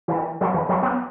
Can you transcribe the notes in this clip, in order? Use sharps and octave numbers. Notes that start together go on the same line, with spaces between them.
E3
F#3
E3
F#3
B3